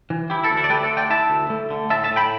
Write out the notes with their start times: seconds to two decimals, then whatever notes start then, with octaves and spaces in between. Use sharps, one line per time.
0.10 E3
0.30 E4 G4
0.43 E4 A4
0.50 D2
0.57 E4 A4
0.64 D5
0.70 A3 G4 B4
0.83 A4 D5
0.90 D3
0.97 D5 G5
1.10 E4 E5 A5
1.30 D2
1.50 A3
1.71 D3
1.90 A2 E5 A5
2.04 E5 A5
2.11 A2
2.16 G5 B5